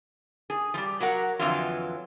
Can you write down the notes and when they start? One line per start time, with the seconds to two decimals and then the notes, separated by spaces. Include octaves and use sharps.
0.50 G#4
0.74 F3 G3
1.00 F#3 F#4 A#4 F#5
1.39 F2 D3 E3 F#3 F4